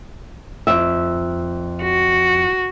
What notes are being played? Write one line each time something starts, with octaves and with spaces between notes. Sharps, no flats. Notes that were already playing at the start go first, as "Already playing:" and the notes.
F2 E5
F#4